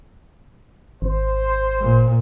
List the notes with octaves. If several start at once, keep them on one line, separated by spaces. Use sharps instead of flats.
G#1 C5
A#2